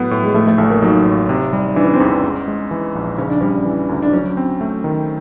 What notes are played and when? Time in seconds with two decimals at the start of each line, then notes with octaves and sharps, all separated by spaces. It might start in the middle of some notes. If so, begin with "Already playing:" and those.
Already playing: A2 F#3 B3
0.11 A2
0.23 G#3
0.34 A2 A3
0.47 A3
0.58 A1 A3
0.70 A#3
0.82 F#3 D#4
1.06 A1
1.29 C3
1.53 G3
1.76 E3 D4
1.84 C#4
1.93 C4
2.00 E2 C#4
2.23 G#2
2.48 G#3
2.71 E3
2.95 A#1
3.18 C#3 C#4
3.30 D4
3.41 G3 C#4
3.65 E3
3.89 D2
4.02 D4
4.12 F#3 C#4
4.37 C4
4.61 A3
4.84 D#3